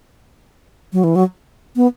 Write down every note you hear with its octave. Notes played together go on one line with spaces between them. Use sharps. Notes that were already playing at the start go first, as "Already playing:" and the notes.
F#3
E3
F#3
B3